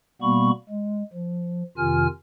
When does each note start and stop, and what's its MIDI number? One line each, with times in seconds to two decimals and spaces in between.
0.22 0.51 47
0.22 0.51 55
0.22 0.51 58
0.22 0.51 59
0.22 0.51 83
0.22 0.51 85
0.69 1.03 56
1.13 1.63 53
1.78 2.07 41
1.78 2.07 48
1.78 2.07 51
1.78 2.07 65
1.78 2.07 80
1.78 2.07 89